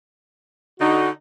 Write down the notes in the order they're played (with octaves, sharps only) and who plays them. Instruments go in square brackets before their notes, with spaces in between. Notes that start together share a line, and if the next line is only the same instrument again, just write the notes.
[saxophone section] D3 D#4 [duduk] F#4